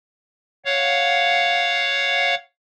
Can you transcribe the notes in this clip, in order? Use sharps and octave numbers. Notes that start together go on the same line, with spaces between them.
C#5 F5 F#5